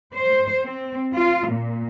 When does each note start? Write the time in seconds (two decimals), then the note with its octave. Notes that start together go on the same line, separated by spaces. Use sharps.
0.13 C5
0.63 C4
1.12 F4
1.49 A#2